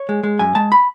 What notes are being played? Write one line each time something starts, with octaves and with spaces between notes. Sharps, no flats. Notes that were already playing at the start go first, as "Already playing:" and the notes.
Already playing: C#5
G#3
G#3
F#2 G#5
G#3 A5
B5